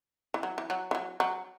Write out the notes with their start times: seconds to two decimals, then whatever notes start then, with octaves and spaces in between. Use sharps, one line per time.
0.34 E3
0.43 F#3
0.58 E3
0.70 F#3
0.91 E3
0.95 F#3
1.20 F#3